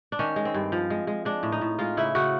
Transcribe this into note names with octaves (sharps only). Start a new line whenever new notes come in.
D4
D#3 C#4
G#3
C4
G2
F3
G#3
G#3
G#3 D4
A2
D#4
A2
G#3 F4
C#3 E4
C#3 F#4